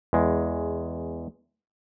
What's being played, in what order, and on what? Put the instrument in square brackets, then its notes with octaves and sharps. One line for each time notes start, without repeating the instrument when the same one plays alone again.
[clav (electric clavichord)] E2 G#3